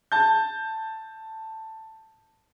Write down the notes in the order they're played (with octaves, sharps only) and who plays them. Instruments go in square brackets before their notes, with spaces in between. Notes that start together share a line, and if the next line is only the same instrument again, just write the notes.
[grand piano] A5 G6